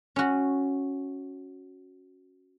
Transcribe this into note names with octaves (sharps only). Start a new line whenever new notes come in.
C#4 F#4